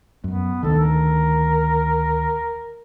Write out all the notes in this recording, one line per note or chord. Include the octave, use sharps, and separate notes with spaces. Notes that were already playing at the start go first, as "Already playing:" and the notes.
F#2 B3
D2 D#3 A4
A#4